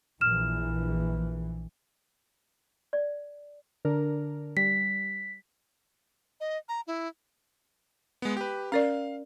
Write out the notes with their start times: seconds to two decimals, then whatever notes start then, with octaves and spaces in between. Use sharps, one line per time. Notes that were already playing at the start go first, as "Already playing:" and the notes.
0.21 A#1 E3 F6 E7
2.93 D5
3.85 D3 D4 A#4
4.57 G3 B6
6.40 D#5
6.69 A#5
6.87 E4
8.22 G#3 B3
8.37 G4 B4
8.72 C#4 A#4 D5 F5